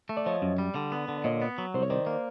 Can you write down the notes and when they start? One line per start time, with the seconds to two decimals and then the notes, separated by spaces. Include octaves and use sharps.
0.09 A3
0.17 D5
0.25 F3 C#5 D#5
0.42 F#2
0.58 G3
0.75 D3
0.92 B3
1.08 D3
1.18 D5
1.24 A#2 C#5 D#5
1.42 B3
1.58 F#3
1.74 C2 C5
1.83 C#5
1.90 D#3 C5 D5
2.07 A#3